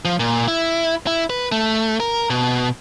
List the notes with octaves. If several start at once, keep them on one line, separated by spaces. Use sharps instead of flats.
F3
A#2
E4
E4
B4
A3
A#4
B2